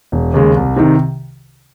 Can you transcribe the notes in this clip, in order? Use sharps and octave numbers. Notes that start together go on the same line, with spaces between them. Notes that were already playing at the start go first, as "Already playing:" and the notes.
E1
D#2 C#3 G#3
C2
C3 D#3